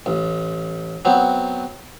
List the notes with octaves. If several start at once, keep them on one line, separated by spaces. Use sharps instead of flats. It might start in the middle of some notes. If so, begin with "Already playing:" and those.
A1
F#3 B3 C4